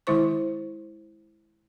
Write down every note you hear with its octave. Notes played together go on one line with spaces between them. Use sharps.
D#3 G#3 E4 C5 C#6